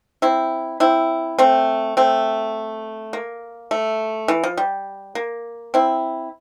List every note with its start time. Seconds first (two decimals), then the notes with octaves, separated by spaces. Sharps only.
0.22 C4 E4
0.80 C4 E4
1.38 A3 C4
1.97 A3 C4
3.13 A#3
3.71 A3
4.28 E3
4.43 F3
4.57 G3
5.15 A#3
5.74 C4 E4